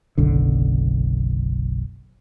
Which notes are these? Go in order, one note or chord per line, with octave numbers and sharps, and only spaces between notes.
F#1 B1 D3